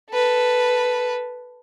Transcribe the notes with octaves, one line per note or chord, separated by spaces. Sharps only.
A4 B4